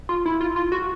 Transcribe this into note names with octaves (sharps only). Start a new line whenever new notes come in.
F4
E4
F4
F4
F#4